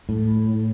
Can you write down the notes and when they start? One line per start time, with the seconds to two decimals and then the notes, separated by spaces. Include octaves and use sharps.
0.09 A2